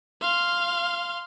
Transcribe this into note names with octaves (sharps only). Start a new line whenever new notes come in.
F5 C6